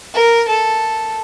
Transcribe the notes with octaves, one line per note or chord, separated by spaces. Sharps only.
A#4
A4